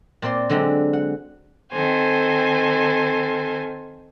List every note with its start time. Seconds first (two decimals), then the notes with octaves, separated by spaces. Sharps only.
0.22 A#2 C4 D5 C6
0.49 D3 F#3 G#3 C4
0.93 F#5
1.71 D#3 C4 A4 C5 G#5